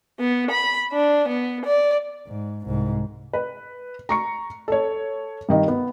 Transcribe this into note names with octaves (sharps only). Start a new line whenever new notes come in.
B3
B5
D4
B3
D5
G#2
C2 G#2
B4
A#5 C#6 C#7
A4 C#5
G2 D#3 D#5
B3